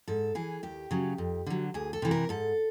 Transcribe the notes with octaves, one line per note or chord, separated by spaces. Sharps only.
G#2 A4
E3 G#4
D#2 G4
C#3 F#3
F2
D3 F#3
D2 G#4
A4
C3 E3
A#4
G#2 A4